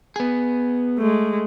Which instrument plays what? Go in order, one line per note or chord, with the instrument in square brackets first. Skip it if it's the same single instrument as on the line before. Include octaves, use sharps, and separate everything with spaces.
[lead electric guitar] B3 G#4
[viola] G#3 A3